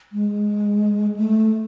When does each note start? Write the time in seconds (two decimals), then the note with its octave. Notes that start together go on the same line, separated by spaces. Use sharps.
0.12 G#3
1.16 A3